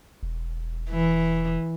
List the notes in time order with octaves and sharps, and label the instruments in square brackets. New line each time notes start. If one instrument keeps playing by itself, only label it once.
[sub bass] E1
[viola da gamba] E3